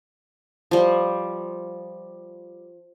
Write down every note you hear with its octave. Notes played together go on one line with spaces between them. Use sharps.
F3 G3